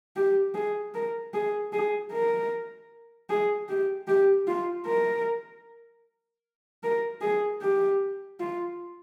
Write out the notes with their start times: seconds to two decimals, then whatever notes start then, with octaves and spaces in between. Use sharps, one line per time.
0.16 G4
0.54 G#4
0.95 A#4
1.34 G#4
1.73 G#4
2.12 A#4
3.30 G#4
3.69 G4
4.08 G4
4.48 F4
4.87 A#4
6.83 A#4
7.21 G#4
7.62 G4
8.40 F4